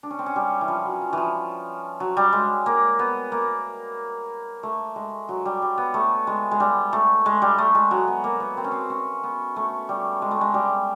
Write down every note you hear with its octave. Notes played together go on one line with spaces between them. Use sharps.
D4
C#4
C4
C#4
G3
E3
F3
F#3
F3
E3 F3
F#3
G3
G#3
A#3
B3
A#3
A3
G#3
F#3
G3
G3
B3
A3
G#3
G#3
G3
A3
G#3
G3
A3
G#3
F#3
B3
A#3
B3
C4
C#4
C4
C#4
B3
A3
G3
G#3
A3
G#3
G3